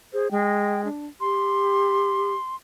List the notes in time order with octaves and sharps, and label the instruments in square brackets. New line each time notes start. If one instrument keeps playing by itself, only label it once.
[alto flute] G#4 [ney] C5
[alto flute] G#3 [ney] G5
[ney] D4
[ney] G4 [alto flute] C6